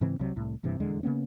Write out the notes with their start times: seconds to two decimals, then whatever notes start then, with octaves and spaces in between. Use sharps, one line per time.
0.01 G#2 C#3 E3 C4
0.19 C2 C3 F#3
0.36 C2 A2
0.63 F#1 G2 C3 E3
0.80 D#1 E2 D3 G#3
1.03 C#3 A#3 B3 C#4